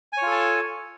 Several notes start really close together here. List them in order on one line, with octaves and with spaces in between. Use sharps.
G#5 C#5 F4 A4 A5